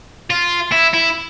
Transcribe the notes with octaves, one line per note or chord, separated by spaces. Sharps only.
F4
E4
E4